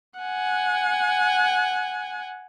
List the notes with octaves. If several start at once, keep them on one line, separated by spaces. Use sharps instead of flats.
F#5 G#5